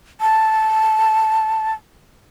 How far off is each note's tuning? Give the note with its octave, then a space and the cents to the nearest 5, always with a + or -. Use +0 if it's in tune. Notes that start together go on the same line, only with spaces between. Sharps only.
A5 -5